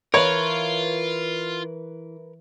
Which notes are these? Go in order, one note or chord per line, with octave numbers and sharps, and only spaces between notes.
E3 F4 A#4 B4 C#5